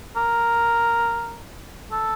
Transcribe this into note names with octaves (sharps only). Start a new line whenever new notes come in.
A#4
A4